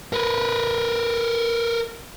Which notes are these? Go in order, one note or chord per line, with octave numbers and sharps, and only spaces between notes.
A#4 B4